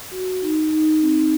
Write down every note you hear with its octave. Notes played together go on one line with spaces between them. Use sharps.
F#4
D#4
D#4
C4